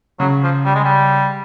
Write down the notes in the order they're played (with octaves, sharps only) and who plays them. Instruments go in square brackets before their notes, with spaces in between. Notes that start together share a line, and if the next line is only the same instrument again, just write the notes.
[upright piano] C#3 [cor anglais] F#3
[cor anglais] F3
G3
G#3
G3